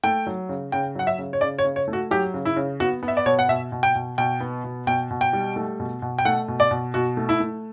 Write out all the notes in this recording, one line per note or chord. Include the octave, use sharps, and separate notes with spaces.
A3 G5
F#3
C#3
C#3 G5
F#3 F#5
E5
C#3
C#5
C#3 D5
C#5
C#3
C#5
A3
F#4
F#3 G4
C#3
E4
C#3
B3 F#4
B3
E5
D5
B2 C#5
F#5
B2 E5
B2
G5
B2
B2 G5
B3
B2
B2 G5
B2
G5
G3
A3
B2
B2
G5
A3 F#5
B2
D5
B2
B2 F#4
A3
E4
A3